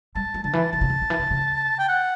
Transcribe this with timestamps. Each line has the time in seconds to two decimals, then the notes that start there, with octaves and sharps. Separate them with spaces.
0.15 G3 A5
0.34 G3
0.44 D3 A5
0.53 E3
0.72 D3 A5
0.81 C#3
0.90 D3
1.01 D3
1.10 E3
1.19 D3
1.31 C#3
1.79 G5
1.89 F#5